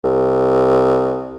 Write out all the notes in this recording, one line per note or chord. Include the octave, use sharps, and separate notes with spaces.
C2